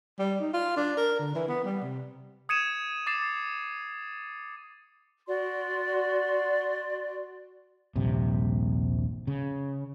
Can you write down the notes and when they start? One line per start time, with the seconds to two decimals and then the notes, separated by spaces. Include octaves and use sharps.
0.19 G3
0.40 D#4
0.53 F4
0.77 D4
0.97 A#4
1.19 D3
1.35 E3
1.48 B3
1.64 G3
1.82 C3
2.49 D#6 G#6 C#7 D#7 E7
3.07 D6 A6 C7 E7
5.28 F#4 D5 C6
7.96 D#1 A#1 G2 C3
9.27 C#3